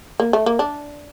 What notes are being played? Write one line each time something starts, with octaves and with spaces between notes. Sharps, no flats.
A#3
A3
A#3
D4